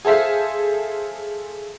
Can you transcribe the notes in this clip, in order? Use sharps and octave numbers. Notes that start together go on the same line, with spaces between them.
G#4 A4 C5 E5 F5